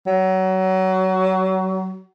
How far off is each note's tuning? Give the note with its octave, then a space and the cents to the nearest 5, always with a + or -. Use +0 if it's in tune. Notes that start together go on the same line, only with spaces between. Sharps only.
F#3 +25